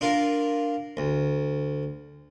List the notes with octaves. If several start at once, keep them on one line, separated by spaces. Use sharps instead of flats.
D4 F4 A#4
D2